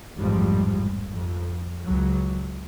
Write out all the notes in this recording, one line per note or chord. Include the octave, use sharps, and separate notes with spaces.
A1 F2 G#2 F3 G3 G#3
F2
C#2 F#3